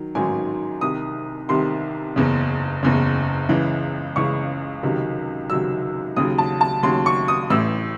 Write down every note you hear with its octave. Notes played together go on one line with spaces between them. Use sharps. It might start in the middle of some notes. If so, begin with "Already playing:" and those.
Already playing: D#3 F#3
A1 G#2 D#3 F#3 G#5
C2 C3 D#3 D#6
C2 C3 D#3 C6
F#1 E2 C#3
F#1 E2 C#3
C#2 C#3 E3
C#2 C#3 E3 C#6
C#2 C3 D#3 F#3
C#2 C3 D#3 F#3 E6
D#2 C#3 F#3 D#6
A5
A5
D#2 C#3 F#3 C6
C#6
D#6
A1 A2 E3 E6